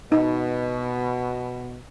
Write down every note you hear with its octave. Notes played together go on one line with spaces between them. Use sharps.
B2 D#4